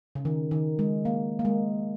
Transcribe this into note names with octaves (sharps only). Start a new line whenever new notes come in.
C#3
D#3
D#3
G#3
A#3
A#3
G#3